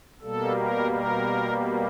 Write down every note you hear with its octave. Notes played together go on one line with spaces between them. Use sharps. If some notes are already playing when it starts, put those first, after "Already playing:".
B2 G3 A#3 A4
A#4
A#4